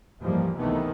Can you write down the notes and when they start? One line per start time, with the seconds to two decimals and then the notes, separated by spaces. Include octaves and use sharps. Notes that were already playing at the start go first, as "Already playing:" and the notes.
0.20 D#2 G#2 E3 F3 G3 A#3
0.57 C#2 C3 D#3 E3 A3 B3